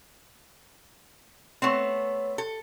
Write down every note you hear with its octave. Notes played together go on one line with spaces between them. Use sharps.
A3 B3 C4 C#5
A4